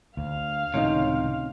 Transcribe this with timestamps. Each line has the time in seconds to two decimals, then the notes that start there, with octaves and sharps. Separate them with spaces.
0.17 D2 F5
0.74 C#2 A2 C3 D#3 C#4 D#4